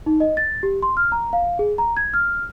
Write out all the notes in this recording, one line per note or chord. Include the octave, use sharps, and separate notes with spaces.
D#4
D#5
A6
G4
C6
F6
A#5
F5
G#4
A#5
G#6
F6